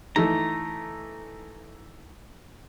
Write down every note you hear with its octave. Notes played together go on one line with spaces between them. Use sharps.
E3 A3 D#4 A#5